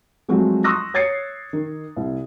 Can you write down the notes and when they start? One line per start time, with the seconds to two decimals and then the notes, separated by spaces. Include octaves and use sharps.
0.29 F3 F#3 G#3 A3 C4 F#4
0.64 C6 C#6 D#6 E6 F#6 A#6
0.94 C#5 G#6 A6 C7 C#7
1.53 D#3
1.96 C2